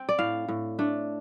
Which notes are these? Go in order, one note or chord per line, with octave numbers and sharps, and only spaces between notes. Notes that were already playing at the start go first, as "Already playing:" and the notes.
Already playing: C4 G5
D5
A2 F5
A2
A3 D4